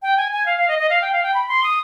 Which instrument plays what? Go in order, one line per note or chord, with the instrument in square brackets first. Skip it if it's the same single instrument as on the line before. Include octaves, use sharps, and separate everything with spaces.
[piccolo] G5
G#5
G#5
F5
F5
D#5
D#5
F5
G5
F5
G5
B5
C6
D#6